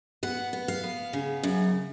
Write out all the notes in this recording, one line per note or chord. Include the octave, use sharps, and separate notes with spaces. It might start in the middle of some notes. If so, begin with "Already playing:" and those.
B3 F#5
B3
F5
B3
C#3
F#2